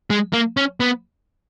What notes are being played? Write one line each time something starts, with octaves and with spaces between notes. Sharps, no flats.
G#3
A#3
C#4
B3